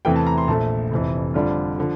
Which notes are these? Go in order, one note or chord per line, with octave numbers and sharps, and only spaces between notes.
E2 C3 E3 A3 G5
A5
A#5
C6
A#1 A#2 A3 A5
F1 F2 E3
F2 D3 G3 D4 F4
D3 F3